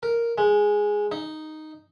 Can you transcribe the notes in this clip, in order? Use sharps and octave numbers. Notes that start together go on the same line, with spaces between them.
A#4
G#3
D#4